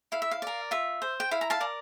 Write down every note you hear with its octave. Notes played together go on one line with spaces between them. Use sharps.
E4 F5
E5
F5
A#4 D5
F4 E5
C5
G5
E4 F5
A#5
F5 A5
A#4 D5